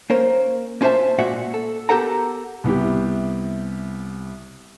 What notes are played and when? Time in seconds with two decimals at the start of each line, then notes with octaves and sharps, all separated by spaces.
0.10 A#3 C#4 A#4 C5
0.81 A#3 C#4 F4 C5 E5 A5
1.18 A#2 G#3 F#4 E5 F#5
1.54 A4
1.89 B3 G4 A4 A#4 F#5 A#5
2.64 C2 B3 E4 G4